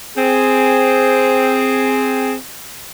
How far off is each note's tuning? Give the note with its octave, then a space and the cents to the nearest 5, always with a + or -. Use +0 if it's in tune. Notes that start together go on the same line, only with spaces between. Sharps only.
C4 +0 G#4 +0